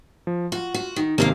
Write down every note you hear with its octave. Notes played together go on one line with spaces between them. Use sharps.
F3
F4 F#4
F#4
D#3
G#1 C3 D#3 A#3 A4 F5